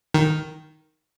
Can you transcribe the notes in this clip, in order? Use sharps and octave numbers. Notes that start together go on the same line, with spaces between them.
D#3